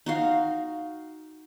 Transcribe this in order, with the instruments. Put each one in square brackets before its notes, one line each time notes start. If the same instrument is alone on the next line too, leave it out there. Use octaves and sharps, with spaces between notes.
[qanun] D#4 F#4 F5